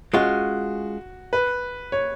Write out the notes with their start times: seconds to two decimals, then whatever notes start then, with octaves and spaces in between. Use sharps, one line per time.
0.14 G#3 C#4 F4 F#4
1.33 B4
1.92 C#5